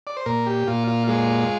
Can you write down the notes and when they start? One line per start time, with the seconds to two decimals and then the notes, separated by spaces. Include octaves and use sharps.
0.07 D5
0.17 C5
0.26 A#2 A#4
0.46 G4
0.67 A#2 F4
0.88 F4
1.08 G#3 F4